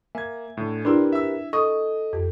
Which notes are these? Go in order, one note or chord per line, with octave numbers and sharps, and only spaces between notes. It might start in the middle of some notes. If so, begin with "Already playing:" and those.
A#3 E5 G#5 G#6
A2 D3
D4 E4 G4 A#4 B4 D5 C6 E6
E5 E6
A4 D#5 C#6 D#6
F2 G4